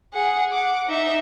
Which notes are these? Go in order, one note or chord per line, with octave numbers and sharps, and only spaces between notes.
G#4 F#5
F#5 D6
D#4 E5